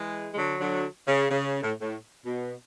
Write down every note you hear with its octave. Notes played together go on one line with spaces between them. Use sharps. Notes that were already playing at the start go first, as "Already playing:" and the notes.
Already playing: E3 G#3
G#3
D3 F#3
D3 F#3
C#3
C#3
A2
A2
B2